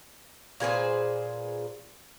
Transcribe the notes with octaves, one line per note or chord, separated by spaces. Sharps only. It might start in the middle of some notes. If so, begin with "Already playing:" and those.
A#2 G#4 B4 C5